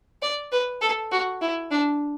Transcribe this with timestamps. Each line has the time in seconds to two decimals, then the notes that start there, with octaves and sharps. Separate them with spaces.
0.22 D5
0.52 B4
0.81 A4
1.12 F#4
1.41 E4
1.71 D4